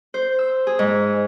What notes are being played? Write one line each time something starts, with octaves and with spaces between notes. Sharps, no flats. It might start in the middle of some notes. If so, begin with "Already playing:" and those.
C5
E6
G#4
G#2